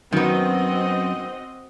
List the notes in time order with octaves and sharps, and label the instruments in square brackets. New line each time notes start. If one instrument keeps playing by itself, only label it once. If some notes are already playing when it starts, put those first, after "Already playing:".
[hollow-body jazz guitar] F#2 [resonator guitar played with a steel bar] D#3 B3 [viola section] C4 F#4 D#5